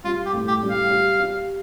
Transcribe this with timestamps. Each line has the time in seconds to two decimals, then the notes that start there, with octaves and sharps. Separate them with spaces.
0.04 G3 F4
0.26 G4
0.33 A2
0.48 G4
0.62 G3
0.69 F5
0.90 G4
1.19 G4